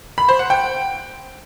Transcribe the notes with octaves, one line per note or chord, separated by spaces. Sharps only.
B5
C5
F#5
G5